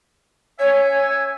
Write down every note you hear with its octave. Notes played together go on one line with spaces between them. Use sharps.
C#4 C#5 E5 G#5